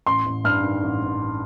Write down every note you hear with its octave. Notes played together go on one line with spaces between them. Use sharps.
A1 C6
A1
G2 F6
D#3
A1
A1